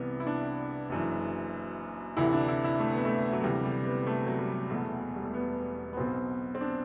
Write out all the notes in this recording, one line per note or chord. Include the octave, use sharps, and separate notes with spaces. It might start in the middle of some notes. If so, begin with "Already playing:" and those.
Already playing: C2 C3 E3 B3
E4
D4
F#1 F#2 E3
D2 C3 E3 E4
D4
E4
E4
A3
B3
A3
F#3
D2 C3 E3 G3
G3
B3
A3
F#3
G3
E1 E2 B2 A3
G3
A3
B3
B3
B1 B2 C4
C4
D4